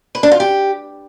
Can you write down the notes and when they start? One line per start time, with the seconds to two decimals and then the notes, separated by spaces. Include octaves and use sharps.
0.15 B4
0.23 D4
0.32 F4
0.40 G4